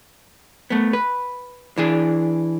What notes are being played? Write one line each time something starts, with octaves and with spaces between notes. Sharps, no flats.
A3 B3
B4
E3 D4 G#4